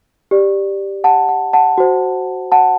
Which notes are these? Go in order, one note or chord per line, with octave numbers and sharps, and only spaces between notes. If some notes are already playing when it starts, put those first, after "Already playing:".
G4 D5
F#5 A5
F#5
F#5 A5
F#4 C5
F#5 A5